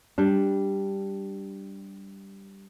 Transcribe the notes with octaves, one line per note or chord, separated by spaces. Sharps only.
G3 D4